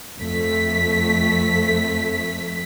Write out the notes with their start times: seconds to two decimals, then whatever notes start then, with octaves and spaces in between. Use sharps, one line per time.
0.19 F2 A3 B6